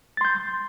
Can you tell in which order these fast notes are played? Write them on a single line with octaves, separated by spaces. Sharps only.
A6 C6 G6